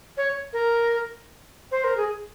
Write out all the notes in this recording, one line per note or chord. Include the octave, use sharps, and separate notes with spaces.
C#5
A#4
C5
A#4
G#4